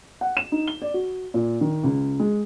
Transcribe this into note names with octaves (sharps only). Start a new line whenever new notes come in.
F#5
E7
D#4
G7
D5
F#4
A#2
D#3
C#2
G#3